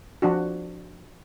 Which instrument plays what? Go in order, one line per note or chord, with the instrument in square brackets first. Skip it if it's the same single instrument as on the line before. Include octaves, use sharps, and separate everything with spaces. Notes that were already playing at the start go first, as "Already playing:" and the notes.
[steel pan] F3 D4 F#4